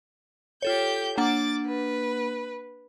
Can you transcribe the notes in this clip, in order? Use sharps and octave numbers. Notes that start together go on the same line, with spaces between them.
F4 G4 A4 C#5 G6
A#3 D4 F#5 D6 A6
B4